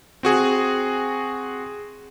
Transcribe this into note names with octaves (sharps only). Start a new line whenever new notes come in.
C4 F#4 G#4